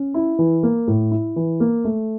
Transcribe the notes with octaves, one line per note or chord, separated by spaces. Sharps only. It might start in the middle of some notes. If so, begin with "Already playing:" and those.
Already playing: C#4
E4
E3
A#3
A2
E4
E3
A#3
A3